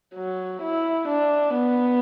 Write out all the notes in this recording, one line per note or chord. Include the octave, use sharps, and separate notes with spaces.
F#3
E4
D4
B3